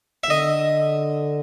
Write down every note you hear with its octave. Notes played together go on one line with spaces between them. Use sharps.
E5
D3 D#5